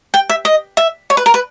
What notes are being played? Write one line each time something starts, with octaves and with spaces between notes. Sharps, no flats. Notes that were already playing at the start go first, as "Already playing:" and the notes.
G5
E5
D#5
E5
C#5
B4
A#4
B4